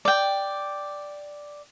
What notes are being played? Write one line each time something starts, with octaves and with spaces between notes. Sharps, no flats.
D5 G5